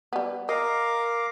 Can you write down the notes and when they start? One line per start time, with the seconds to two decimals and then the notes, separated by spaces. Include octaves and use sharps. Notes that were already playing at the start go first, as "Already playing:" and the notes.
0.13 G3 B3
0.49 A#4 D#5 F5 A#5 D6